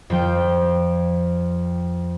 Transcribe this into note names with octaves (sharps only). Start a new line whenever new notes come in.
F2 F3 G5